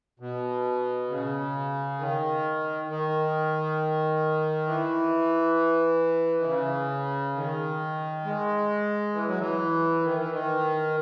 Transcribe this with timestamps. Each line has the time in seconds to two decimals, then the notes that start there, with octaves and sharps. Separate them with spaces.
0.20 B2
1.09 C#3
1.99 D#3
2.88 D#3
4.67 E3
6.38 D#3
6.45 C#3
7.35 D#3
8.24 G#3
9.14 E3
9.27 F#3
9.38 E3
10.03 D#3
10.17 E3
10.31 D#3